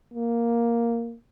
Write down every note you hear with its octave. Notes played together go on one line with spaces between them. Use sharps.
A#3